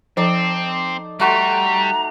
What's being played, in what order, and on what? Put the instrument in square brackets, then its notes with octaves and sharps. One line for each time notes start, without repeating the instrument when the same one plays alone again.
[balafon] F3 [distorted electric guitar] C4 [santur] D#4 A4 D5
[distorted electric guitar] G3 [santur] A3 F#4 C6 [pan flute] A#5